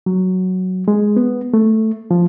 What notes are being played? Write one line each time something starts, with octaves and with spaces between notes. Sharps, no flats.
F#3
G#3
B3
A3
F3